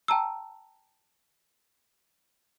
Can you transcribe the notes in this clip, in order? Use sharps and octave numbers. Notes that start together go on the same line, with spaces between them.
G5 A5 A#5 E6